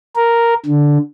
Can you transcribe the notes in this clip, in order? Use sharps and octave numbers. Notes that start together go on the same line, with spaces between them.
A#4
D3